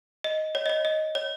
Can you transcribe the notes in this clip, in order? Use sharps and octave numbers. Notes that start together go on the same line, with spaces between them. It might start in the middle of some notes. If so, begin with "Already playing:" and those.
D#5
C#5
D#5
C#5
D#5
C#5